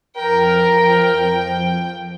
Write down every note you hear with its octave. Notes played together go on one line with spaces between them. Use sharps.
F2 F3 A#4 G5